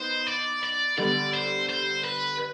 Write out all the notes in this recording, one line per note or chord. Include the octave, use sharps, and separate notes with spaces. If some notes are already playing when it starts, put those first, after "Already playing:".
Already playing: B3 D#4 B4 C5
D5
D5
D3 G3 B3 D5
C5
C5
B4
B4